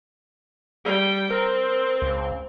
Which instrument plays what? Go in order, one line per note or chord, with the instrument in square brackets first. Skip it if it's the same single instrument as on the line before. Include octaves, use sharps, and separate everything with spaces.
[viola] G3 G5
[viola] C4 [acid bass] A#4
[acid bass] C#2